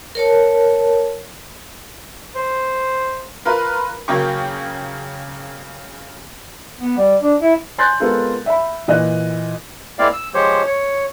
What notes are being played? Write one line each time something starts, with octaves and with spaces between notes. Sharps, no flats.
A#4 C#5 A5
C5
F4 A#4 B4 B5
C#3 F#3 A#3 G5 C#6
B3
G3
D4
E4
G#5 C6 F#6 G6 A6
G#3 B3 C4 F4 A4 A#4
E5 B5
A#2 E3 D#5 F#6
G#3 A#3 C4 E4 D5 F5
E6
F3 G#3 G4 C5 C#5
C#5